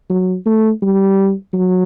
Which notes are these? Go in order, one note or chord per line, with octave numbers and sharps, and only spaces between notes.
F#3
A3
G3
F#3